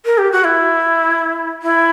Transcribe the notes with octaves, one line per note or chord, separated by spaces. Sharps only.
A#4
G4
F#4
E4
E4